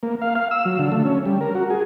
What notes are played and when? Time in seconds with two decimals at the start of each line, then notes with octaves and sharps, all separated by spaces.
0.03 A#3
0.21 F5
0.35 F5
0.51 E6
0.65 F#3
0.79 D3
0.92 A3
1.05 C#4
1.26 G3
1.41 A#4
1.55 F#4
1.70 G#4